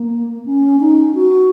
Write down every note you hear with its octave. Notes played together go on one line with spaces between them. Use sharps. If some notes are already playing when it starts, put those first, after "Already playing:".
Already playing: A#3
C#4
D#4
F#4